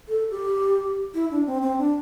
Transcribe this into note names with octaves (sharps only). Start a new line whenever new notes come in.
A4
G4
E4
D4
C4
C4
D4